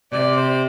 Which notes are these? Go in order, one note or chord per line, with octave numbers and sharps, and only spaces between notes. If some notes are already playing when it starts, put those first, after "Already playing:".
C3 D5
C5